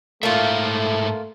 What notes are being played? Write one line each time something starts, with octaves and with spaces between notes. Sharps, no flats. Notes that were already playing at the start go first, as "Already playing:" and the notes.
G#2 A3 A#3 F4 A4 E5